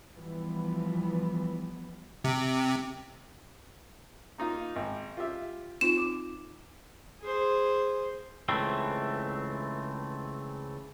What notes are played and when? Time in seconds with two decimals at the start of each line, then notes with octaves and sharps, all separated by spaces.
0.15 E3 F3 G3 B3
2.24 C3
4.38 A#3 D#4 F4
4.76 G#1
5.17 F4 G4 E5
5.81 C4 D#4 F4 E7
5.97 D6
7.21 G#4 C5
8.49 C#2 E3 A3 C4